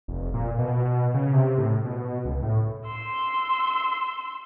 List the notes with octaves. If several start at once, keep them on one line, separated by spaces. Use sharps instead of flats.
F1
A#2
B2
C#3
C3
A2
B2
C#2
A2
C6 E6